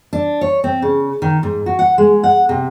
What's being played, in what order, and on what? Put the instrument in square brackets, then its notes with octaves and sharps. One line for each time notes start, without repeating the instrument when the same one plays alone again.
[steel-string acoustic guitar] D4
C#5
C4
C#3
D#3
G#2
F#4
F#5
G#3
F#5
C3